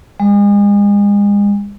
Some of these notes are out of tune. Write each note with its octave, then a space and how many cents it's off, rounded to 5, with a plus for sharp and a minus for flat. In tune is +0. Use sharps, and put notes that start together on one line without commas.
G#3 -35